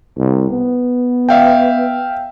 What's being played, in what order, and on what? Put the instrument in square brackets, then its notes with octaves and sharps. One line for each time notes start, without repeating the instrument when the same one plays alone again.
[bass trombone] C2
B3
[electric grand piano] E5 F5 G5